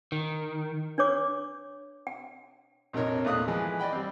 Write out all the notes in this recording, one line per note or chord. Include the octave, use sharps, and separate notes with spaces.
D#3
D4 B4 C#5 D6
G5
A#1 F2 C3 D#4 A#4 C#5
E2 A#2 A3 F5 D#6 F#6
E3 F3 G#3
D5 D#5 G5 B5
G3 C4